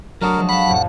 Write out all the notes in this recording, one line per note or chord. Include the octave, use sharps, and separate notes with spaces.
F#3 A3 D4 F#4 A#4 D#6
F3 G#3
F5 F#5 A5 B5
C2 F2 A2